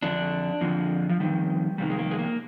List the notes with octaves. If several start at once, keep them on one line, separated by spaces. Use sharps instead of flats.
F2 D3 D4
F2 D3 F3
F3
F2 C3 D#3 G3
F2 C3 D#3 G3
G#3
A#3
G#3
A#3